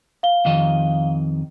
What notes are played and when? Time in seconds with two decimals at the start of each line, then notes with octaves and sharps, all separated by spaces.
0.23 F5 G7
0.45 F2 D#3 D#5